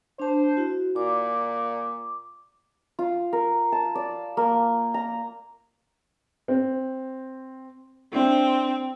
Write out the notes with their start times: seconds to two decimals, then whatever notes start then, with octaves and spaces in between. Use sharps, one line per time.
0.19 D4 C5 A5
0.57 E4 F#4
0.96 A#2 D6
2.99 F4
3.33 A#4
3.72 A5
3.95 D5
4.37 A#3
4.94 A#5
6.48 C4
8.13 C4 D4 E4